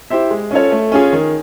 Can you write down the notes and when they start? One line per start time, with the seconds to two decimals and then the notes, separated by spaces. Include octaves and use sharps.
0.10 E4 G4 C5 E5
0.31 G#3
0.51 C#4 F4 A4 C#5
0.72 A3
0.92 C#4 F4 G#4
1.13 D#3